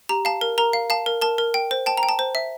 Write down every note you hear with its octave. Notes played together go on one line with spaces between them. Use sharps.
G4 A#5
F5 A5
A#4
A#4 A#5
F5
F5 A5
A#4
A#4 A5
A#4
G5
C5
G5 A5
A#5
G5
A5
C5
E5